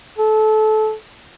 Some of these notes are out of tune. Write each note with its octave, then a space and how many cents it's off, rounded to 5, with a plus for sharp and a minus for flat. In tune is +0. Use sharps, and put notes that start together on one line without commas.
A4 -25